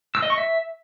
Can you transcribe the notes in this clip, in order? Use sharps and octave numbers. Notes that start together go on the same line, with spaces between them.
E6
D#5
C#6
E5